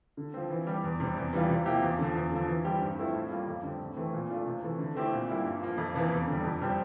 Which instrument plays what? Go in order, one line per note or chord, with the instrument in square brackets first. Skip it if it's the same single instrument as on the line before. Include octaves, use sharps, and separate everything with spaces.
[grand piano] D3
F3 C4
E3
G3 D4 G4
E2
C3 G3 D4
E2
E3 G3 D4 F4
C3
F3 A#3 E4 G4
E2
D3 F3
E2
D3 F3
E3
G3 C4 G4
G2
F3 A3 C4 E4
A2
G3 A#3 F4
F2
D3 G3 C4
A2
E3 A3 C4
A#2
A3 D4 F4
C3
E3 A3
D3
A3 C4 E4 G4
A#2
G3 A#3 E4
G2
F3 A#3
F2
C3 E3 A#3
E2
D3 G3
F2
C3 G3 C4 G4